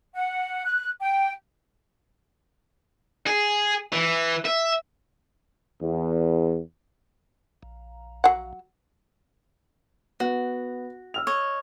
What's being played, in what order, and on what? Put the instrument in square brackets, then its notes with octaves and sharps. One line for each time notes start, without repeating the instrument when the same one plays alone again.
[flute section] F#5
F#6
G5
[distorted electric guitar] G#4
E3
E5
[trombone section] E2
[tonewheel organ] A#1
[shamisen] F#3 F#5
[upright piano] B3 [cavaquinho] F#4
[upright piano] E6 F6 F7
[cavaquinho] C#5 D#5